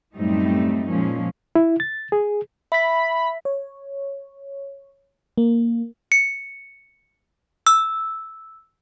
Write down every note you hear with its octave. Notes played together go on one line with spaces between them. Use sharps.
F#2 A2 G3 A3 C4 D#4
A#2 F3 G#3 C#4
E4
A6
G#4
E5 B5 B6
C#5
A#3
C#7
E6